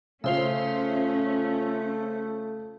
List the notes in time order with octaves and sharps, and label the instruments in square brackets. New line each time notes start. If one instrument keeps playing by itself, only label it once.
[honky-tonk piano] C#3 [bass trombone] A3 [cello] C#4 [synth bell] F4 C5 E5